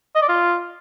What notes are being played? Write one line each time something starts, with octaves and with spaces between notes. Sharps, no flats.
D#5
D5
F4